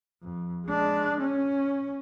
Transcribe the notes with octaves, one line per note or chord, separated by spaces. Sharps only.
F2
G#3 D4
C#4